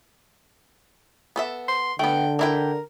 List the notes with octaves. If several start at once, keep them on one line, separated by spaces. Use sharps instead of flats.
B3 A4 E5
C6
D3 A3 B3 G5
D4 E4 A#4 G5